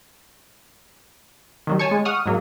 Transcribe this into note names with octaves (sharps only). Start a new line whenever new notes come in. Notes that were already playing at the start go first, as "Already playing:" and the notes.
D#3 F#3 G3
C#5 G#5 A5 C#6
G#3
F#5 C#6 D#6 F6
G#2 F#3 A#3